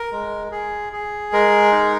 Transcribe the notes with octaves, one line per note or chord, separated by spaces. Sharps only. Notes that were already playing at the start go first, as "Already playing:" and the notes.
Already playing: A#4
G#3
G#4
G#4
G#3 A#4
D#4